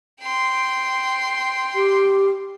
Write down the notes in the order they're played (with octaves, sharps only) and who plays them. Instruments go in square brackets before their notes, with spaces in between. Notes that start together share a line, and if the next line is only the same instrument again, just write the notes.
[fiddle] G5 C6
[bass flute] G4